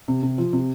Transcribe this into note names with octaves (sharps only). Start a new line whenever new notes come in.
C3
C3
F3
C3